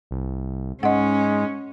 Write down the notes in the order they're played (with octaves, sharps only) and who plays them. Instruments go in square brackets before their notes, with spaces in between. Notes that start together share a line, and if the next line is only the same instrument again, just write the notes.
[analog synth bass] C2
[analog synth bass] G#2 [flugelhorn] G#3 [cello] C#4 [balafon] D#5 F#5